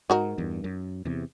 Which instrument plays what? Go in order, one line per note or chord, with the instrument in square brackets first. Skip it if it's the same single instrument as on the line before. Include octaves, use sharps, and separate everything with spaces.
[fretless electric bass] G#2 [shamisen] D#4 F#4 A#4
[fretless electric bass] E2 G2
F#2
E2 C3